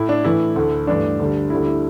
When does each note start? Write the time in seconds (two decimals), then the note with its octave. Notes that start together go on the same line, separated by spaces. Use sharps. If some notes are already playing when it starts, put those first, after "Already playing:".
Already playing: A2 A3 E4
0.09 D4
0.24 A2 E3 A3 E4
0.56 D2 D3 A3
0.87 G2 E3 A3 D4
1.19 D2 D3 G3
1.50 D2 D3 G3 E4
1.66 E4